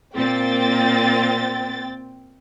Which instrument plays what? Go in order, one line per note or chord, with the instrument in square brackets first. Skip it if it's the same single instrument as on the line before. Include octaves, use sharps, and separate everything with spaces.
[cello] A#2 A#3 [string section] C4 G5 A6